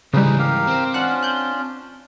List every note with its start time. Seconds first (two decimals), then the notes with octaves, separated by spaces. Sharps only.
0.14 G#2 C#3 E3 G3 D#4 G#4 B4
0.39 G4 A#4 F5
0.67 C4
0.94 C#4 D4 F4 F#5 F#6
1.23 F#6 G6